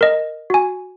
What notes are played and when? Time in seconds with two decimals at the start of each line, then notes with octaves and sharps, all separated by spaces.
0.01 A#4 D#5
0.50 F#4 G#5